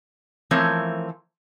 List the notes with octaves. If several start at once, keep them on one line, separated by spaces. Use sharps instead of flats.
E3 F3 A3 C4 A#4 C#5